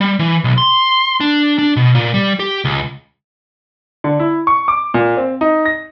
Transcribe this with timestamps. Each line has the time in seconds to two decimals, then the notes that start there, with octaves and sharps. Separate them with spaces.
0.01 G3
0.19 E3
0.44 B1
0.58 C6
1.20 D4
1.58 D4
1.76 B2
1.95 A#2
2.14 G3
2.39 G4
2.65 C#2
4.04 D3
4.19 E4
4.47 C#6
4.68 D6
4.94 A#2
5.17 C4
5.41 D#4
5.65 A#6